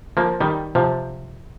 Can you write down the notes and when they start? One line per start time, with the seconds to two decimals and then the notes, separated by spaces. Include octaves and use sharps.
0.17 F3 A#3
0.41 D#3 G3
0.75 C3 F3